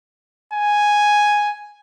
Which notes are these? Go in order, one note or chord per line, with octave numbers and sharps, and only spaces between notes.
G#5